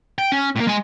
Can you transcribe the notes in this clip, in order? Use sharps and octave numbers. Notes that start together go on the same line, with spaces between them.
G5
C#4
A2 A#3
G#3 G#5